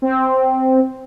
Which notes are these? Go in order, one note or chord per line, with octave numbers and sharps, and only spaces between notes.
C4